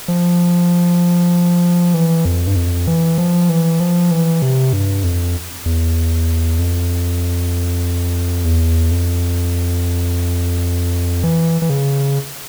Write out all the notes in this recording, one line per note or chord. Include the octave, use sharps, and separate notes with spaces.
F3
E3
F2
G2
F2
E3
F3
E3
F3
E3
C3
G2
F2
E2
F2
E2
F2
E3
E3
C#3